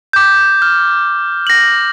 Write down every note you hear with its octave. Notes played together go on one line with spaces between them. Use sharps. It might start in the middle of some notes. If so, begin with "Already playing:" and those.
D6 G6
F6
A#6 F#7